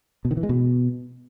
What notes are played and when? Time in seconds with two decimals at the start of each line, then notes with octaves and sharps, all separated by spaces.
0.25 B2
0.31 D#3
0.37 E3
0.43 G#3
0.49 B2